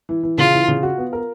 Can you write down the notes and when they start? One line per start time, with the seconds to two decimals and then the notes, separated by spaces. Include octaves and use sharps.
0.09 E3
0.23 E3
0.38 C#3 F4
0.54 E3
0.68 C#3
0.83 F#4
0.98 B3
1.13 A#4